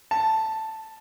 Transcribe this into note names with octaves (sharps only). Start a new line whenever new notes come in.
A5